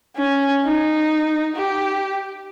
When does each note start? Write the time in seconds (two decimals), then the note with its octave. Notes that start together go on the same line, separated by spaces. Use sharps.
0.17 C#4
0.64 D#4
1.56 G4